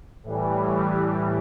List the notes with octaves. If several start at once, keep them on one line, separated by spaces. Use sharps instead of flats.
A2 E3 G3